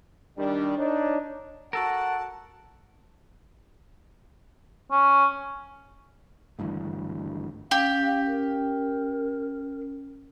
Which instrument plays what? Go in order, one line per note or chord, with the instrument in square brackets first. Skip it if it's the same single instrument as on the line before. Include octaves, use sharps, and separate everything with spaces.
[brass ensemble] D#3 G3 D4
D4 D#4 C#5
[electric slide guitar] F#4 A4 A#4 [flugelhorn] F#5 [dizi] A5
[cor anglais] C#4
[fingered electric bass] G#1 D2 G2 E3
[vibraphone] C#4 [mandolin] G4 [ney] F5
[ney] A#4